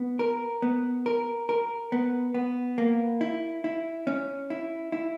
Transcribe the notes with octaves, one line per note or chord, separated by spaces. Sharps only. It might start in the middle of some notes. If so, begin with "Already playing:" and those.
Already playing: B3
A#4
B3
A#4
A#4
B3
B3
A#3
E4
E4
C#4
E4
E4